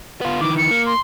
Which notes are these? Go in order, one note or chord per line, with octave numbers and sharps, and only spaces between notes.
B3 F4
D#3 E3 D6
C#7
A#3
C6